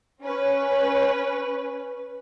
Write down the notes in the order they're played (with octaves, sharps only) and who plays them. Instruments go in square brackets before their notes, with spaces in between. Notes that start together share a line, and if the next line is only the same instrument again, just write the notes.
[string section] C#4 B4